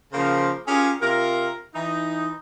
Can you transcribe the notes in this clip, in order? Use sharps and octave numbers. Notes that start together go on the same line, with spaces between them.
C#3 F3 A#3 A#4 C5
C#4 F4 G4 G#4 A#4
C3 F4 A#4
E3 D#4